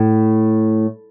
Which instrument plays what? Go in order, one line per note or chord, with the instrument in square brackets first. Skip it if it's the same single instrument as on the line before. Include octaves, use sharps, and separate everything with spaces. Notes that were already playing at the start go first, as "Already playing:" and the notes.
Already playing: [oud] A2